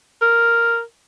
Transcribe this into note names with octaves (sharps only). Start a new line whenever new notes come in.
A#4